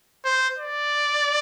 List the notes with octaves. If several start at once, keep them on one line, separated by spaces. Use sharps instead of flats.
C5
D5